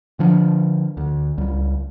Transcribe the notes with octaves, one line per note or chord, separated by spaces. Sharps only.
D3 F3 D4
D2
C#2 G3